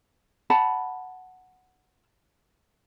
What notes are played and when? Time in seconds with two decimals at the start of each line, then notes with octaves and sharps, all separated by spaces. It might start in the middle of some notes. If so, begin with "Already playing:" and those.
0.50 F#5 A5 B5